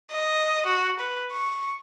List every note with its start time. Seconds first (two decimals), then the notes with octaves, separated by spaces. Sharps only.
0.12 D#5
0.67 F#4
1.00 B4
1.33 C#6